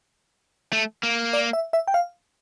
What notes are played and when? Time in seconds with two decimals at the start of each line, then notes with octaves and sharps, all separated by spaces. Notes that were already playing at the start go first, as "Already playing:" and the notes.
0.73 A3
1.03 A#3
1.33 D5
1.53 E5
1.73 E5
1.88 G5
1.94 F5